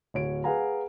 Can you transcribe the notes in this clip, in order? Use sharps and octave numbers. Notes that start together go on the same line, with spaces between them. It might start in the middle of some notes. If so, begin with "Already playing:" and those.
D1 C#5 D7
G#4 B4 F5 F#5 G#5 A#5